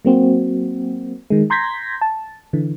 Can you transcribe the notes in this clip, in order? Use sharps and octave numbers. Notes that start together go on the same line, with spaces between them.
F#3 A#3 C4 F#4
D#3 G#3
A#5 C6 G6 G#6 A#6 B6
A5
D3 E3